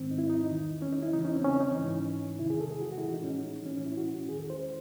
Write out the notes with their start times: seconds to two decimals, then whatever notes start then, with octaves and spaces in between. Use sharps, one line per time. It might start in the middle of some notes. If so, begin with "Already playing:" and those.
Already playing: G#2 D#3 C4
0.11 D#4
0.18 E4
0.30 D#4
0.50 E2 D#3
0.82 C#4
0.93 D#4
1.02 E4
1.13 E2 C#3 E3 D#4
1.25 C#4
1.35 C4
1.44 C#4
1.60 D#4
1.77 G#2 E3
2.39 E2 C3 D#3 E4
2.50 G#4
2.60 A4
2.71 G#4
2.81 F#4
2.92 F#4
2.98 E4
3.03 A2 E3 F#4
3.14 D#4
3.24 C#4
3.66 A2 E3 C#4
3.77 C#4
3.86 E4
3.97 F#4
4.29 E2 D#3 G#4
4.40 A4
4.50 C5